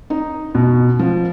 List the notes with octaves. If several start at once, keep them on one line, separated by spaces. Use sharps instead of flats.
D#4
B2
F3